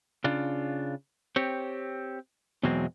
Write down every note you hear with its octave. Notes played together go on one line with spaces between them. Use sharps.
C#3 D4 F4
C4 G4 C#5
E2 B2 E3 F#3 G#3 C4